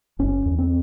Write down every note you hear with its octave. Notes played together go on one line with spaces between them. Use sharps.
F#1 C#4
E2
C4